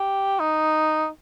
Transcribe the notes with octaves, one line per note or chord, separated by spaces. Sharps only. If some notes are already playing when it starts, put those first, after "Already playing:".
Already playing: G4
D#4